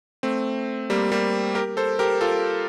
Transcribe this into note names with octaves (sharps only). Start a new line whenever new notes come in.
A3 C4
G3 A#3
G3 A#3
G4 A#4
A4 C5
G4 A#4
F4 A4